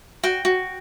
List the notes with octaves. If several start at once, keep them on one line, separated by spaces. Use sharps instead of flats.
F#4 G5
F#4